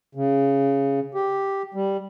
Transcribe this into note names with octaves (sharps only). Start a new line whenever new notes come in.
C#3
G4
G3